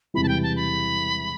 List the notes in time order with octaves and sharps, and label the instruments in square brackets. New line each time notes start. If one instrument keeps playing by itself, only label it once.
[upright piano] E1 E2 C3 E3 G3 [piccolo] B5
[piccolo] A5
G5
A5
B5